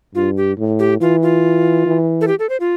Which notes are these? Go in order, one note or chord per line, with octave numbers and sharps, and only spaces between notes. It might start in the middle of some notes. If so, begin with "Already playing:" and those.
G2 F4
G4
A2
G4
E3 F4
F4
E3
A4
G4
A4
C5
F4